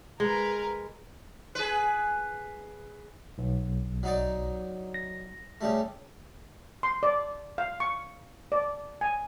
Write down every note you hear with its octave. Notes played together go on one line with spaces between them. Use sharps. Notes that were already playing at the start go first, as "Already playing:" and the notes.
G#3 A#4 B4
G#4 B4
B1
F#3 D#4 D5
A#6
C#3 G3 A3
C6
D5
F5
C#6
D5
G#5